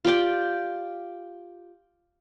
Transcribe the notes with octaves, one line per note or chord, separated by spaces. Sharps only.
F4 G4 D5 G5